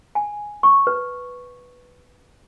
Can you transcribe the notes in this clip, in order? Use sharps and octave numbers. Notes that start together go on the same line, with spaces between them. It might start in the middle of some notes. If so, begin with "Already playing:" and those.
G#5
C#6
B4